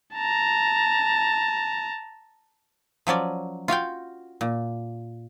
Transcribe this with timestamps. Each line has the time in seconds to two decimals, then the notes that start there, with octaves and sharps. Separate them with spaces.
0.15 A5 A#5
3.07 F3 F#3 C#4 D5
3.68 F4 F#4 F5 G5
4.41 A#2